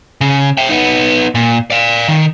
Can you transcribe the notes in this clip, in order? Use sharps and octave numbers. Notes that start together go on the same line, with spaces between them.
C#3
E5 G5
B3 D#4
A#2
D5 F5
D#3